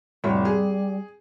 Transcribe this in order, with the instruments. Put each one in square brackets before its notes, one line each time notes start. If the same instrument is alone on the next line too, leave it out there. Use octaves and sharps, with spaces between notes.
[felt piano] F1 A2 C#5 [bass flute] G3
[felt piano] G#4